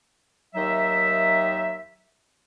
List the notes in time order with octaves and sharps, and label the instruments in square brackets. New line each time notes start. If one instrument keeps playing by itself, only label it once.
[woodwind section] D#2 D#3 F#3 D#4 E5